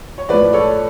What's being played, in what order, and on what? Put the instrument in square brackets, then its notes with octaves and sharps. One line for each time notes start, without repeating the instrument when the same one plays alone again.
[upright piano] C#5
A2 F3 B4 D5
A4 C#5